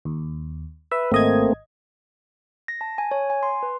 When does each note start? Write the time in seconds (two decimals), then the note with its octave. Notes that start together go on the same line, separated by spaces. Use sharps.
0.05 D#2
0.92 B4 E5
1.12 G#1 A3 A#3 C4 D#5 G#6
2.68 A#6
2.81 A5
2.98 G#5
3.11 C#5
3.30 G#5
3.43 C6
3.63 B4